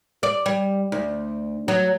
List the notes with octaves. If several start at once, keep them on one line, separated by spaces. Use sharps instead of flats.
D5
G3
D2
F#3